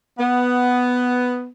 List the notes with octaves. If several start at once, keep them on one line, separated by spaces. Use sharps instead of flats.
B3